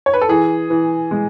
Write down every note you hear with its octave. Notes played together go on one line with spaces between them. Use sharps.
C#5
B4
A4
E3 G#4
E3
G#3